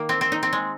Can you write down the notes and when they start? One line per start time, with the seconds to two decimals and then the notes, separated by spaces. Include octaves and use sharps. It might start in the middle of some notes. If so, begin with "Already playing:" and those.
Already playing: D#3 A#3
0.09 C4
0.21 C4
0.32 D#4
0.43 C4
0.53 G#3